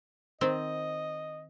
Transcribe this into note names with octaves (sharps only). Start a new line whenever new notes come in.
D#3 C4 D#5